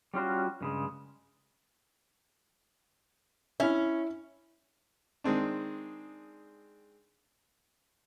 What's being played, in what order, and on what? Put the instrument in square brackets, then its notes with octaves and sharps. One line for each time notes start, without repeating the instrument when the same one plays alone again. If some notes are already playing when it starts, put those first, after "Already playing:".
[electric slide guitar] G3 C#4 F4 F#4
G2 C#3 G#3
[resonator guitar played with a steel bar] C#4 [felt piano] E4 E5
[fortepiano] D#3 G#3 C4 D4